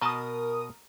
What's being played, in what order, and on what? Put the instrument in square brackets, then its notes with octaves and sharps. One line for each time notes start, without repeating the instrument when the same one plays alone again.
[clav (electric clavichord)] B2 D#5 A5 [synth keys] A#4 D#6